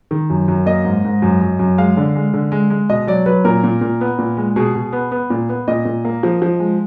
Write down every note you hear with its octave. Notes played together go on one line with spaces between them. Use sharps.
D#3
F#2
F#2
A#3 D#5
G#2
G#2
F#2
F#2
F#2
G#3 F5
D3
G#3
D3
G#3
G#3
B2 D#5
F#3 D5
F#3 B4
A#2 A#4
A#2
A#2
B3
A#2
G#3
B2 G#4
B2
B3
B3
A#2
B3
A#2 D#5
A#2
A#3
F3
F3
G#3